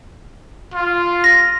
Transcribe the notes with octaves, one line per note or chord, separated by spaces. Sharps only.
F4
A#6